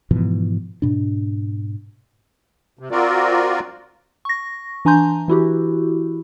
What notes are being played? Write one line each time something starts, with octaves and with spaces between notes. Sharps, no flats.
G#2 B2 E3 F3
G#2 B2 D4
C3
C4 F4 F#4 A#4 D5
C#6 A#6
E3 D4 G#5 A#5 C6 G6
E3 E4 F#4 G4